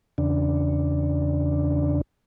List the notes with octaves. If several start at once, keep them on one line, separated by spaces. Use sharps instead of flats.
E2 C#3 D4